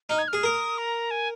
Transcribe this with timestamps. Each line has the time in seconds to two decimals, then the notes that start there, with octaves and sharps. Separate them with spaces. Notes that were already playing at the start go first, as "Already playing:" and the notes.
0.09 D#4 F6
0.18 G#6
0.28 F6
0.33 G#4
0.43 A#4 D#6
0.78 A#5
1.11 G#5